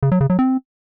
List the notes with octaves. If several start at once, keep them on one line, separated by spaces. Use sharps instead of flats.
C#3
F#3
C#3
F#3
C4